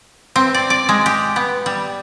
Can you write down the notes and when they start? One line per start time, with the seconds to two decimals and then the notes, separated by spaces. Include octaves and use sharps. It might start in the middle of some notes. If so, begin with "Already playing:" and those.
0.36 C4
0.54 D5
0.70 D5
0.89 G#3
1.06 G4
1.36 B3
1.66 G3